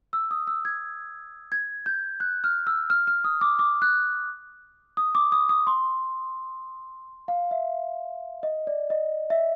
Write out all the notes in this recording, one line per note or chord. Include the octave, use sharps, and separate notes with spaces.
E6
D#6
E6
G#6
G#6
G6
F#6
F6
E6
F6
F6
D#6
D6
D6
F#6
D#6
D6
D#6
D#6
C6
F5
E5
D#5
D5
D#5
E5